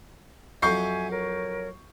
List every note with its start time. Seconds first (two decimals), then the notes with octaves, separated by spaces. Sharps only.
0.62 F2 F#3 E5 G#5 C#6 G6 C7
1.11 A#4 C#5